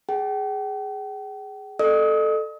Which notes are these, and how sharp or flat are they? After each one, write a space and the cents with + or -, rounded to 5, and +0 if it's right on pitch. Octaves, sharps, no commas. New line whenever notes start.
G#4 +0 G5 -45
A4 +0 D#5 -40 D#6 +35